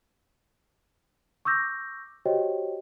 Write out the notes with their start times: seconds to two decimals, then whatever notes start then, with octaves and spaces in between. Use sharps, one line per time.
1.45 C#6 D6 E6 G6 A#6
2.25 F#4 G4 C5 C#5 D#5 G5